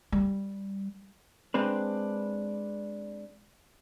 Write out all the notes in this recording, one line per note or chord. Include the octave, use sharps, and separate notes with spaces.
G3
G#3 C4 D4 B4